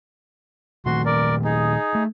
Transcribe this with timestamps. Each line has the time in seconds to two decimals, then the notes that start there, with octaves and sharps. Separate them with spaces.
0.86 A#2 D#3 A3 F#4 C6
1.06 A#4 D5
1.44 D#4 G#4
1.95 A3